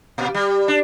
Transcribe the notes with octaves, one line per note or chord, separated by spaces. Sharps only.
A#2
G3
D4